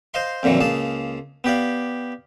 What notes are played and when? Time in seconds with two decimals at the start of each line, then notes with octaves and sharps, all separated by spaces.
0.14 C5 D#5 F5 C6
0.43 F2 A#2 D3 E3 F#3
0.61 C#2 A#3 G#4 A5
1.44 B3 G4 D5 F5